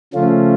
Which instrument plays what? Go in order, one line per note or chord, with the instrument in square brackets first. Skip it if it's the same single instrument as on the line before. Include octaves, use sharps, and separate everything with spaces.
[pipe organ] C#3 F3 A3 C#4 F4